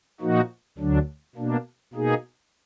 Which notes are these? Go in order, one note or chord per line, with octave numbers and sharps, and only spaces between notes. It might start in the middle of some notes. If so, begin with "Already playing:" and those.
A#2 F3 A#3 D#4 F#4
D2 D3 F#3 D4
B2 A#3 D4
B2 A#3 D#4 G#4